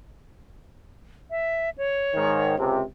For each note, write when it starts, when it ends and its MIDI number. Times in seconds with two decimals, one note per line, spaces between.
1.30 1.70 76
1.78 2.56 73
2.15 2.56 44
2.15 2.56 51
2.57 2.82 37
2.57 2.82 48